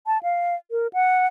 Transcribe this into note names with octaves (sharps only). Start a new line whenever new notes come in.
A5
F5
A#4
F#5